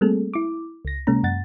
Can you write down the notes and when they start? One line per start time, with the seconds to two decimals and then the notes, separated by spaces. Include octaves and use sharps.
0.01 G3 A3 A#3 C4 G#4 A4
0.34 E4 D6
0.85 C#2 A#6
1.07 C3 G#3 A#3 C#4 A#5
1.23 F#2 F#5 A6